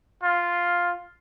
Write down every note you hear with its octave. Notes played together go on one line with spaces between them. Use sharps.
F4